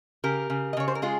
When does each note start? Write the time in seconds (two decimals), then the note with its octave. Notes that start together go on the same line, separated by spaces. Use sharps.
0.24 C#3 G4 A#4
0.50 C#3
0.73 D#5
0.77 C#3 C#5
0.88 C5
0.95 A#4
1.02 G#3 F4 G#4